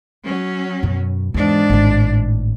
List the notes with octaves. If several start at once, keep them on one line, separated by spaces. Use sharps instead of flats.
F#3 C#4
F#2 B2
E2 G#2 D4
G#1 A2